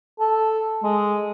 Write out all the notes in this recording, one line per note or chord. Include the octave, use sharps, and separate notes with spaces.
A4
G#3